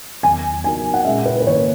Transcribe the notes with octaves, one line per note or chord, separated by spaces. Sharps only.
E2 D#3 F#3 B3 G#5
F#3 B3 D#4 F#4 A#4 G#5
F#5
A#2 G#3 C#4 G#4 E5
B4
B4
G#2 D#3 A#3 C#5